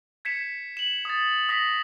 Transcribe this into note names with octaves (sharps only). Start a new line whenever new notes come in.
G#6 B6 C#7 E7
E7 F#7
D#6 A6
D#6 A#6 B6 F#7